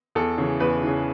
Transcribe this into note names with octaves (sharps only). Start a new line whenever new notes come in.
E2 A4
C#3 E3
E2 B4
C#3 E3